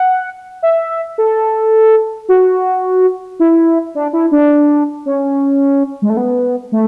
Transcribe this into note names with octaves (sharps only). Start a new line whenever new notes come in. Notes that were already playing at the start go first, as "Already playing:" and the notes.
Already playing: F#5
E5
A4
F#4
E4
D4
E4
D4
C#4
G#3
A3
B3
A3